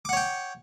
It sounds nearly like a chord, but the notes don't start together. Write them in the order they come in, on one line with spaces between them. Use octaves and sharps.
D6 F#5 C#5 G5